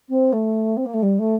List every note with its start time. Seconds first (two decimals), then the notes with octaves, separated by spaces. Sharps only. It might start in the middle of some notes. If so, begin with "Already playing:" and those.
0.09 C4
0.32 A3
0.76 C4
0.85 A#3
0.93 A3
1.02 G3
1.18 A3